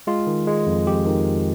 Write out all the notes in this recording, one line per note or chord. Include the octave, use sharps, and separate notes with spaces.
G#3 F4
D#3
G#3
F2
F2 G4
D#3